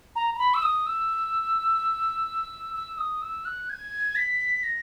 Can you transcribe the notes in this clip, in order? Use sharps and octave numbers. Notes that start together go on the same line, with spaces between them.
A#5
A#5
B5
E6
D#6
E6
E6
D#6
E6
F#6
G#6
B6
A#6